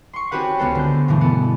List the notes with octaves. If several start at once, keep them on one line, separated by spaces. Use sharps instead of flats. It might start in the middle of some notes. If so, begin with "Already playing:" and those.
C6 C#6
C4 C#4 F#4 G4 B4 F#5
C#2 B3 A4 C5
D3 G6
G2 B2 E3 A3
B3 A4